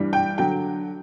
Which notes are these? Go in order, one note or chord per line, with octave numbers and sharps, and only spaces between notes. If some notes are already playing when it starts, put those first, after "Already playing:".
Already playing: G2 E3 G3
G5
D3 F#3 G5